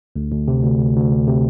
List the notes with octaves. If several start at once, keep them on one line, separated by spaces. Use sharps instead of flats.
D2
D2
C3
D2
D2
D2
D2
C3